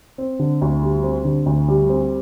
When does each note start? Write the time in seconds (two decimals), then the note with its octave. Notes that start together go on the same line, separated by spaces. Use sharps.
0.18 C4
0.39 D3
0.62 D2
0.82 G3
1.03 C4
1.25 D3
1.46 D2
1.68 G3
1.89 C4